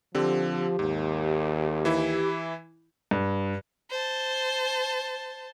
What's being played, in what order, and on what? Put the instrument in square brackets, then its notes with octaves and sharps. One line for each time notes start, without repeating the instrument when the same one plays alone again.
[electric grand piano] D3 C4 [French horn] F3 [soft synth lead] G4
[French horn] D#2 [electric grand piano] G#2
[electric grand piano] E3 E4
[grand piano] G2
[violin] C5 A5